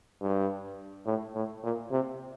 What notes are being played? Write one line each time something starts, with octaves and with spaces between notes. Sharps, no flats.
G2
A2
A2
A#2
C3